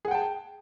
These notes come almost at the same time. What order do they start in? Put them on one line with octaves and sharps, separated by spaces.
G#4 F#5 G5 A5